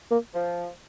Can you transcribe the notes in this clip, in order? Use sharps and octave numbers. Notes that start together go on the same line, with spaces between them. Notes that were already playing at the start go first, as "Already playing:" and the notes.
A#3
F3